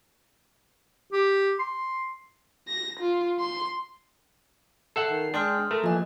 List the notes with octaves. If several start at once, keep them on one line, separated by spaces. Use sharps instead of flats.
G4
C6
A#6
F4
C6
A4 E5 F#5 C7
D#3
G#3 D4 G5 C6 D#6 F6
A3 A#4
E3 F3 A#3 D#5